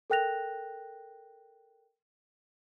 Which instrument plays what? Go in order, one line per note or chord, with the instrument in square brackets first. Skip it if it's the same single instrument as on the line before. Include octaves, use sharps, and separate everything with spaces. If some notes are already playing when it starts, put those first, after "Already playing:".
[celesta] A4 A#4 G5 F#6 A#6 F7